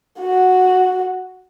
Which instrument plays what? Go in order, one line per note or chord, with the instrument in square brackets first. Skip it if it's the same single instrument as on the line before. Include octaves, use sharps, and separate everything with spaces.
[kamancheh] F#4